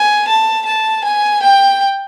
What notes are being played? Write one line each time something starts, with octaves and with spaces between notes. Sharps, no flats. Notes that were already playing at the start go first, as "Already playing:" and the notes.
Already playing: G#5
A5
A5
G#5
G5